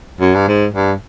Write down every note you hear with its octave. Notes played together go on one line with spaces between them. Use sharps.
F#2
G2
G#2
G2